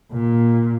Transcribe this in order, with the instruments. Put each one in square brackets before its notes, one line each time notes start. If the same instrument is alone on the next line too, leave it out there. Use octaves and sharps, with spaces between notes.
[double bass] A#2